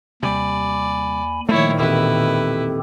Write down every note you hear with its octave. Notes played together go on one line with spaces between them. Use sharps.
D#2 C3 G3 D5 G#5 B5
A#2 D#3 F3 G3 A3 A#3 E4 C#5
E1 C4 E4 G4 A4 B4